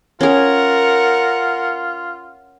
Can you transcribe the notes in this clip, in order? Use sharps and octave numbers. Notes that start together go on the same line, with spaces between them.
C#4 F4 G#4 A#4 F#5